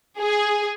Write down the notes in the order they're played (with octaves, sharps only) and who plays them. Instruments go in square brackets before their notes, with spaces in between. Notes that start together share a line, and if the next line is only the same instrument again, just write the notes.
[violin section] G#4